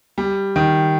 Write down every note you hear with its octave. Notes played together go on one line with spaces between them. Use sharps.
G3
D#3